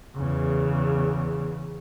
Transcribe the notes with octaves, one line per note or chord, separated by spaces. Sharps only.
E2 C#3